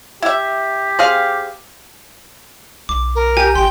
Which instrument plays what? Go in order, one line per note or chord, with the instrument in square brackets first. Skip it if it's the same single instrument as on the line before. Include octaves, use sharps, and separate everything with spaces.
[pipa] E4 E5 [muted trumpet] G4
[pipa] C4 G#4 F5
[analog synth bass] B1 [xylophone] D6
[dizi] A#4
[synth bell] G4 [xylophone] G#5
[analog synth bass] G#1 [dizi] G5 [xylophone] C6